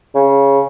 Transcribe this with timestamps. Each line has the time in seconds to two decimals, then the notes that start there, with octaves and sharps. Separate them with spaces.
0.15 C#3